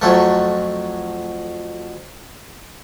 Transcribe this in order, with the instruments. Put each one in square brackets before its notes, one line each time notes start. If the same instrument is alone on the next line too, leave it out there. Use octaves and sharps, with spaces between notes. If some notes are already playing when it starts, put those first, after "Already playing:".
[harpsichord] F2 F#3 A3